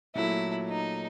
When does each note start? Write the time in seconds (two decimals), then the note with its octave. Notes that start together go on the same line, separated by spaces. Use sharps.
0.15 A#2 F#3 A3 E4
0.69 D#4